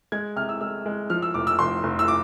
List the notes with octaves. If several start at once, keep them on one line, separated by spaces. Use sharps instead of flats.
G#3 G#6
C3 F6
E6
G#3 E6
G#3
F3 F6
E6
F1 D6
E6
F1 C6
F1
E6
D6